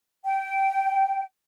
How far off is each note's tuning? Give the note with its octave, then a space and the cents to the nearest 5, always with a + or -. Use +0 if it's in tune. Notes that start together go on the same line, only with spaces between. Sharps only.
G5 -15